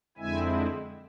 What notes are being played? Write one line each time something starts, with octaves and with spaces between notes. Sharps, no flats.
F2 D3 G#3 C4 E4 E5 G#5